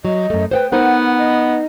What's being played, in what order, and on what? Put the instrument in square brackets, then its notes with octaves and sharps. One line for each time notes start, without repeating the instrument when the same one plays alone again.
[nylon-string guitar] F#3 [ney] D#5
[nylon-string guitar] F#2 A3
[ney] B4 [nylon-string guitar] C5 F#5 G5
[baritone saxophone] B3 [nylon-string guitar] D#4 A#4 C5 [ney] F#5
[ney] D#5